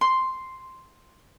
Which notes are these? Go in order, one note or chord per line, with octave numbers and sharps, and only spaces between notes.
C6